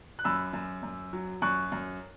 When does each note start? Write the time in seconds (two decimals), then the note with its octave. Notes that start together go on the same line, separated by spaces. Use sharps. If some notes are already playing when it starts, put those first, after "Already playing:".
0.19 F#6
0.24 F#2 B5 E6
0.53 F#2
0.83 F#2
1.13 F#3
1.42 F#2 C#6 F#6
1.72 F#2